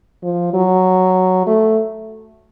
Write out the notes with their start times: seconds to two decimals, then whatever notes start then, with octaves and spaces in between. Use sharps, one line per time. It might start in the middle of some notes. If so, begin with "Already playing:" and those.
0.23 F3
0.53 F#3
1.47 A3